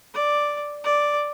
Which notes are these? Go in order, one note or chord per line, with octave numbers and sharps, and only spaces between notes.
D5
D5